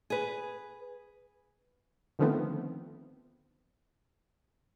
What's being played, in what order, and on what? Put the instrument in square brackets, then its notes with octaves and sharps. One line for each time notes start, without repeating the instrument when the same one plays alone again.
[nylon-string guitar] G#4 B4
[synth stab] D3 D#3 F3 A3 B3 C4